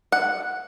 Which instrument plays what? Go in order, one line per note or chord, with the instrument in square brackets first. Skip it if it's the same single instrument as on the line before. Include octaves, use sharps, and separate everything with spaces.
[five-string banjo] F#5